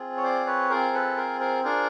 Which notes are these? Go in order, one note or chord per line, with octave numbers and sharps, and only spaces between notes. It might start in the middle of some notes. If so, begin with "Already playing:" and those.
Already playing: C4 F4 G#4
C#5
C5 D5
B4 C#5
C4 F4 G#4 A#4 C5
A4 B4
A#4 C5
A#4 C5
D4 F4 G#4 A#4 C5